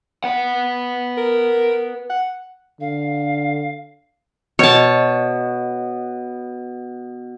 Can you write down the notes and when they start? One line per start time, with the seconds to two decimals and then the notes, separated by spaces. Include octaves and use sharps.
0.24 B4 F#5
1.17 A#4
2.10 F#5
2.81 D3 F5
4.59 B2 C#5 A5